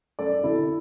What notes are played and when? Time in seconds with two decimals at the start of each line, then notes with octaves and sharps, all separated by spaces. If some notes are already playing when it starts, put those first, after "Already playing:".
0.19 F#2 A4 D5
0.43 D3 E4 A4